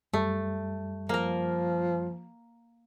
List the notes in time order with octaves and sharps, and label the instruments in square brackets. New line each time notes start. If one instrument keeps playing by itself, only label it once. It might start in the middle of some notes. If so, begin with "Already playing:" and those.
[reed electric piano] F#2 G3 [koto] A3
[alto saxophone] F3 [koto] A#3 A#4